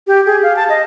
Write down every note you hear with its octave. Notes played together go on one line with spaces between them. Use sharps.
G4
G#4
F5
A5
D#5